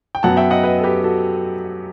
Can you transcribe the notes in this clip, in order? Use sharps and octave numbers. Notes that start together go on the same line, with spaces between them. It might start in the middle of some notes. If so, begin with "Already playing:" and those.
G5
F#2 F#3 B3 F#5 A5
E5 G5
D#5 F#5
B4 D#5
A4
G4 B4
F#4 A4